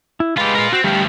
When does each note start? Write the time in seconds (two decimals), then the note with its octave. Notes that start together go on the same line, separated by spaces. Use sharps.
0.20 E4
0.37 G#3 F4 G4 B4
0.55 F4 A#4
0.73 C4 F#4
0.84 D2 F3 G3 G4